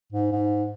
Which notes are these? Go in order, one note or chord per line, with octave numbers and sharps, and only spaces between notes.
G#2
G#2